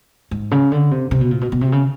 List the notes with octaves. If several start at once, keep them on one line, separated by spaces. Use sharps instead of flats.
G#2
C#3
D3
C3
C3
B2
A#2
B2
B2
C3
C#3